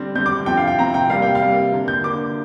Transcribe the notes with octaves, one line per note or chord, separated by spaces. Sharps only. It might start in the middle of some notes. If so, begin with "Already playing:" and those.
Already playing: D3 G3 C4
D3 G3 C4 G6
D6
C3 F3 C4 G5
F5
G5
C3 F3 C4 A#5
G5
C3 G3 A#3 F5
G5
F5
C3 G3 A#3
D3 A#3
G6
D3 A#3 D6